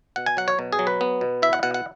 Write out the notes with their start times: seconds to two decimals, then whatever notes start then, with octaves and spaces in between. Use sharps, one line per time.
0.16 B2 F#5
0.26 G#5
0.37 F#3 F#5
0.48 C#5
0.59 B2
0.73 G#4
0.79 F#3
0.87 B4
1.01 B3
1.21 B2
1.42 E4 E5
1.53 F#5
1.63 B2 F#5
1.74 F#5